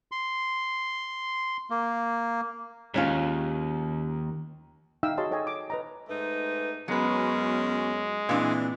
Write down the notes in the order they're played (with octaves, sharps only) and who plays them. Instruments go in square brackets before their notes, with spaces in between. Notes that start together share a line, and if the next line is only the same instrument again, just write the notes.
[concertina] C6
A#3
[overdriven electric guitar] D#2 [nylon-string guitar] G#3 C#4 F4
[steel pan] D#4 E5 F5 G5 E6
F#4 G#4 C#5 D#5 A5 C6
A4 C#5 D#5 G5 G#5
D6
B4 D#5 A#5
[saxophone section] G#2 A3 D#4 [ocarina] B4
[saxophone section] F#2 C#4 [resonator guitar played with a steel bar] F#3 B4 [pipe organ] G#3 [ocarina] B3
[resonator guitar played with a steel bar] A#2 D4 [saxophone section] E3 [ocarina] C4